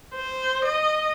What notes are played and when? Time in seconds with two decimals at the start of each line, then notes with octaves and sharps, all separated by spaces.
0.15 C5
0.65 D#5